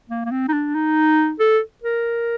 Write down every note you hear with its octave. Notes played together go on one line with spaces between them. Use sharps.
A#3
A#3
C4
D#4
D4
D#4
A4
A#4